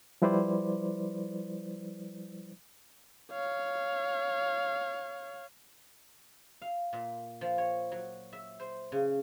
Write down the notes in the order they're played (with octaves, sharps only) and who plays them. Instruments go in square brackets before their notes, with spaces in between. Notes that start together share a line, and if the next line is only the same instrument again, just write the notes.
[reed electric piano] F3 G3 E4 B4 C5 D5
[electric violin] C#5 F5
[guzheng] F5
A#2
F3
C#5
F#3
E5
C5
C#3